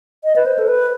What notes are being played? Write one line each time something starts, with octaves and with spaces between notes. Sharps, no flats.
D#5
B4
C5
A4
B4